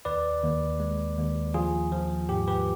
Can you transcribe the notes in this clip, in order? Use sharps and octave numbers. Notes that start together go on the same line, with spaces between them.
D#2 B4 D5
D#2
G#3
D#2
F3 F4 G#4
F3
G#2 G4
G4 B4